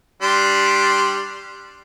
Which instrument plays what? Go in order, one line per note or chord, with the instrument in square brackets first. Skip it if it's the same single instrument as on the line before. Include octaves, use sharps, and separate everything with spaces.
[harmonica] G3 D4 C6